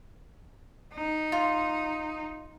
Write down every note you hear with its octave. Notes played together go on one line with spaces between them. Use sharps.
D#4
F4